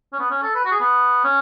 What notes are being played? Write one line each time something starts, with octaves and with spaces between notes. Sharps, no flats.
C#4
B3
C#4
A4
B4
F#4
G#4
B3
C#4